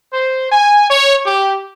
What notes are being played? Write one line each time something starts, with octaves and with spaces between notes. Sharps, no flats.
C5
G#5
C#5
G4